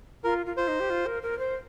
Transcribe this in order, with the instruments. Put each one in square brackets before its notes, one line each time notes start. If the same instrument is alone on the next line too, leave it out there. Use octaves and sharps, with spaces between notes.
[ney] F4 [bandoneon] A#4
[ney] F4
[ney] F4 [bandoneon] C5
[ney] D#4
G4
F4
A#4
A#4
C5